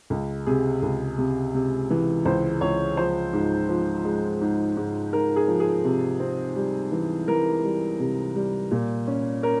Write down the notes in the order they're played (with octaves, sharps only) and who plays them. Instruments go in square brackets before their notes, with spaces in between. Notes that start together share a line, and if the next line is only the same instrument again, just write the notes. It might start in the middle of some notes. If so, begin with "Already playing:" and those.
[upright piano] C#2
C3 G#4
C#2
C3
C3
E3
C#2 C5
C#2 C#5
F3 C5
G#2
F3
G#3
G#2
G#2
G#2 A#4
G#4
F3
G#4
C3
C4
G3
E3
E3 A#4
G3
C3
G3
A#2
C#4
C#4 A#4